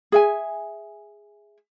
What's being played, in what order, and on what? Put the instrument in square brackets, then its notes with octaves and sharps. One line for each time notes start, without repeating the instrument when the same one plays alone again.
[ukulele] G#4 E5 G#5